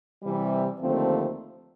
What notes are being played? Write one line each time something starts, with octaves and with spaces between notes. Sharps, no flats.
C3 E3 G3
D#2 D3 F3 A3 C4